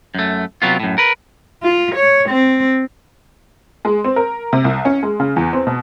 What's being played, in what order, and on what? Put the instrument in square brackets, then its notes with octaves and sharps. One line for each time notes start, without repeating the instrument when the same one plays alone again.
[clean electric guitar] F#2 A3
C3 F#3 B3 F4
F#2 A2
A#4 B4
[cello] F4
C#5
C4
[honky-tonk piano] G#3
C4
A#4
C3
C2
C#4
G#3
C#3
E2
C4
B2